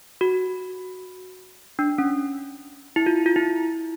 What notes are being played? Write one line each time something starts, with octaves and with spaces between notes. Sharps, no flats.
F#4
D4
C#4
E4
F4
F4
E4